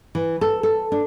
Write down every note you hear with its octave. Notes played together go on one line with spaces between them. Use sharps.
E3
A4
A4
D4